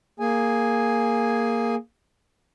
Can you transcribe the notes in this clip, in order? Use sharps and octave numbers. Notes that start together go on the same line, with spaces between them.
A#3 G#4 G#5